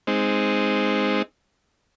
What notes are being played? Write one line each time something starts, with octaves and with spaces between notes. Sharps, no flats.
G#3 C4 D#4